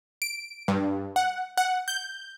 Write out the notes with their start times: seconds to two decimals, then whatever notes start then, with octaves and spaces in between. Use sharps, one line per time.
0.22 D7
0.68 G2
1.16 F#5
1.57 F#5
1.88 G6